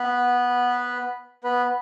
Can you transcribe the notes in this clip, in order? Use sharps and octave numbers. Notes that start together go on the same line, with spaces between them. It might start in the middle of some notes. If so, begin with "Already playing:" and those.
Already playing: B3 B4
B3 B4